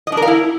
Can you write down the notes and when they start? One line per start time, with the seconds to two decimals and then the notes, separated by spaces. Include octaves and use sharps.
0.07 D#5
0.12 D4
0.17 A#4
0.22 F5
0.27 E4